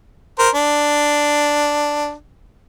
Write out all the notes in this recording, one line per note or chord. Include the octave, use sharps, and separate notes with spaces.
A#4 C5
D4